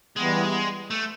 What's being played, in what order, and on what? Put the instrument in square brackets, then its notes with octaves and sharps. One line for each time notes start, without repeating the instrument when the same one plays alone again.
[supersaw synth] E3 G3 B3 [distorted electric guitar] G#3
[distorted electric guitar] A3